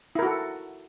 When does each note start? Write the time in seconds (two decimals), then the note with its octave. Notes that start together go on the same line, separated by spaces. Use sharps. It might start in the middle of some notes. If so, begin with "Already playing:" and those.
0.15 E4
0.19 A#4
0.22 F#4
0.26 A4